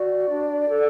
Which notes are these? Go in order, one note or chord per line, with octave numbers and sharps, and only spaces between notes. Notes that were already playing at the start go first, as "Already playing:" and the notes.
Already playing: F#4 D5
D4
A4